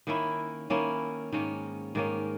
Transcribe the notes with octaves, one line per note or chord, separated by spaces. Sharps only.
D#3 A#3 C#4 E4
D#3 A#3 C#4 E4
G#2 D#3 A#3 C#4
G#2 D#3 A#3 C#4